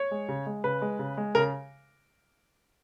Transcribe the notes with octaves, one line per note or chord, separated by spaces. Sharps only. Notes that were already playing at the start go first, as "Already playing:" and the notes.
Already playing: C#5
G#3
C#3
G#3
C#3 B4
G#3
C#3
G#3
C#3 A#4